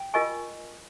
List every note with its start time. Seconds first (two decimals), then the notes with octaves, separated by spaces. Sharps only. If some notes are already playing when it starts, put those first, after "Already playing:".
Already playing: G5
0.14 F4 A#4 D#5 G#5 C#6